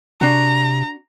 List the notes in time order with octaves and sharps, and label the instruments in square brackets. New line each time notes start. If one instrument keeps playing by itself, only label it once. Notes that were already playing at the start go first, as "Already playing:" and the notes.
[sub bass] C3 [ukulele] D4 F#4 [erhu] A#5